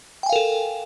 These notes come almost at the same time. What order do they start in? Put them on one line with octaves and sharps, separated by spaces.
G5 G#5 F5 A#4 A4